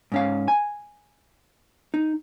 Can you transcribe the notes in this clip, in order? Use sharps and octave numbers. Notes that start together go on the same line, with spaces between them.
G#2 C#4 F5
G#5
D#4